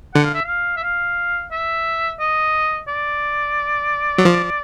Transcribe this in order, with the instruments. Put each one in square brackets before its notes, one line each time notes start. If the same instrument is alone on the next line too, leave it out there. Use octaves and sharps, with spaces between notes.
[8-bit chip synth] D3 [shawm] F#5
[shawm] F5
E5
F5
E5
F5
E5
D#5
D5
[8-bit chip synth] F#3
F3